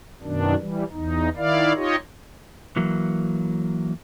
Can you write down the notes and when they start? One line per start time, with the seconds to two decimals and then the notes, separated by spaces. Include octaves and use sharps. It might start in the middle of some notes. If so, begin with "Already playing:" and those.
0.23 F#2 B2 D#3 D4
0.59 E3 G3
0.91 E2 D#4
1.37 D#3 E4 D5 F5
1.76 D#4 F4 G4 C#5 D#5
2.76 E3 F#3 A#3